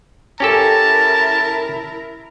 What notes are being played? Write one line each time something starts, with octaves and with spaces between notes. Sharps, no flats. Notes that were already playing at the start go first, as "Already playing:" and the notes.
C#4 E4 G4 A4 A#4 A5